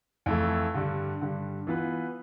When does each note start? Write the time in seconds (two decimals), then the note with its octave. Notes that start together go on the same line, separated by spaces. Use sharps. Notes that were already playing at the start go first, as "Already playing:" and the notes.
0.26 F2 E3 A3 E4 A4
0.74 G2 D3 G3
1.21 G2 D3 G3
1.67 E3 B3 F4 B4